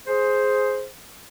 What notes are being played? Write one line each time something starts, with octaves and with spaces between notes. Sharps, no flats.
G#4 C5